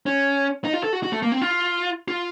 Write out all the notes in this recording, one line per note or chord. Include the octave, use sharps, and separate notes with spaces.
C#4
D#4
F4
A4
F#4
F#4
A3
A#3
C4
F4
F4